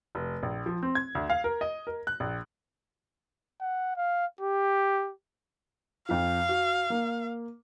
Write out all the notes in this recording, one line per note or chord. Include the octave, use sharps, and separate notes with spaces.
F1
A#1
F3
C4
G#6
D2
F5
A#4
D#5
A#4
F#6
A#1
F#5
F5
G4
F2 F3 F5
F#4
A#3